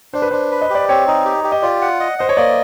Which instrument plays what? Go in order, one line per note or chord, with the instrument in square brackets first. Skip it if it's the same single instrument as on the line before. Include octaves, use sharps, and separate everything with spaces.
[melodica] D4 [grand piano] C5
[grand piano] B4
[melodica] D4 [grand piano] C5
[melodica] B4
[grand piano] D#5
[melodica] G4 [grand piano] D5
[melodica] C4 [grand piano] C#5
[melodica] D#4
G4
G4
[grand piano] D#5
[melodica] F4 [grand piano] D5
[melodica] F#5
D#5
[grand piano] C5 [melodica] D#5
[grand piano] C#5
[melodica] A#3 [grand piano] D5